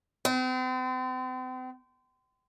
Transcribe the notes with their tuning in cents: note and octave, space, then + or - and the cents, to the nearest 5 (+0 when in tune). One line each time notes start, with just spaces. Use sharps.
C4 -40